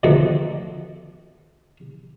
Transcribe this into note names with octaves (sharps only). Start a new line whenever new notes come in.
B2 D3 D#3 F3 A3